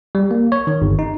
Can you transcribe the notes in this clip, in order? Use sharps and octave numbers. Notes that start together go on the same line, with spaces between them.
G3
A#3
C#5
D#3
G1
D#4